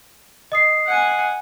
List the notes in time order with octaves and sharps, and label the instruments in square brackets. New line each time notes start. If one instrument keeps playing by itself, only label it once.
[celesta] D#5 D#6 C7
[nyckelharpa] F#5 G#5